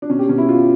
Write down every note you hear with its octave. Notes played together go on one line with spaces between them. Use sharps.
D4
B2 C#4
G4
B2 C#4
E4
B2 F4